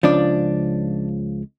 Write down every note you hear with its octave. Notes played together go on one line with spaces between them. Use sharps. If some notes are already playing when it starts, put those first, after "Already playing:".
C#2 C#3 F3 D4 D5